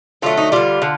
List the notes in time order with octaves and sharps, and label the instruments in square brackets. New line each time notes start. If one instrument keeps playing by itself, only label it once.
[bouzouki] D3 F#3 A3 F4
D#4
D3 G3 F4
D3